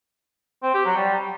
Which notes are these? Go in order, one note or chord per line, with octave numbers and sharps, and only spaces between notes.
C4
G4
F#3
G3